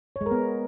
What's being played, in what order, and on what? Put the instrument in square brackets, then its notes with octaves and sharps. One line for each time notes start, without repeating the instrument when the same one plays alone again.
[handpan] C#5
G#3
A#4
B3